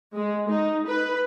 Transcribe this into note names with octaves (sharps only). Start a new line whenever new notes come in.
G#3
D#4
B4